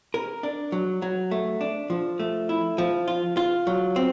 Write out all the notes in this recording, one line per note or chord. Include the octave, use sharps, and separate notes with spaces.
A#4
D4
F#3
F#3
A3
D4
F3
A3
E4
F3
F4
F4
F#3
C4